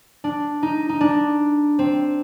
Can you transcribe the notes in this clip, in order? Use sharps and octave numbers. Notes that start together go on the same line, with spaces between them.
D4
D#4
D#4
D4
C4